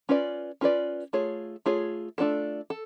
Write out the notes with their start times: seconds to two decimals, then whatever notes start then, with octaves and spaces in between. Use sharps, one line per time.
0.09 C#4 F4 B4 D5
0.61 C#4 F4 B4 D5
1.13 A3 F4 G#4 C#5
1.66 A3 F4 G#4 C#5
2.18 A3 D4 F4 A4
2.70 A4